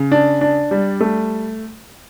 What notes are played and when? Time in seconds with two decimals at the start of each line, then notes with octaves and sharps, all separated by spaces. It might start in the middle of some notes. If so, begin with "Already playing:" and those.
Already playing: C#3
0.11 D4
0.41 D4
0.71 G3
1.00 A3